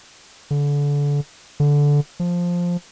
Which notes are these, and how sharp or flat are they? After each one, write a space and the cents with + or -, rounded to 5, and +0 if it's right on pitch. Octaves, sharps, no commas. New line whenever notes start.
D3 -30
D3 -15
F3 +5